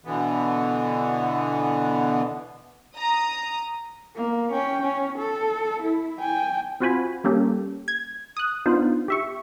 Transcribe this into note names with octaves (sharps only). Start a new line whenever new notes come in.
B2 D3 E3 B3
A#5 D#6
A#3
C#4 G5
C#4
A4
E4
G5 G#5
C4 F4 F#4 C5 G#5 B5
G3 A#3 C#4 G4 A4
G#6
D#6 F#6
B3 D4 D#4 F4 C5
G4 E5 C#6